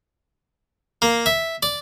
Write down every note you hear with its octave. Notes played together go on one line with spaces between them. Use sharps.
A#3
E5
D5